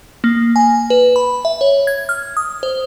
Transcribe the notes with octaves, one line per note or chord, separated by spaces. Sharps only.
A#3
G#5
B4
B5
E5
C#5
G#6
F6
D#6
C5